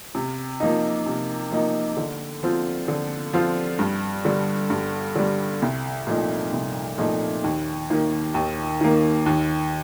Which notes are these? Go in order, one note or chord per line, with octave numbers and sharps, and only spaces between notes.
C3
F3 A#3 D#4
C3
F3 A#3 D#4
D3
F3 C4 F4
D3
F3 C4 F4
G2
D3 G3
G2
D3 G3
C2
A#2 F3 A3 D#4
C2
A#2 F3 A3 D#4
D#2
D#3 A#3
D#2
D#3 A#3
D#2